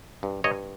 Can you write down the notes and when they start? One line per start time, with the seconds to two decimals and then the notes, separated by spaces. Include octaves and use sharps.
0.23 G2
0.44 G2 C#5 D#5